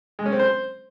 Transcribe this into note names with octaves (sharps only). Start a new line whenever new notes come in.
G#3
C#4
C4
C5